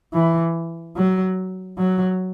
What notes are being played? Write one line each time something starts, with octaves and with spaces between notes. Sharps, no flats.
E3
F#3
F#3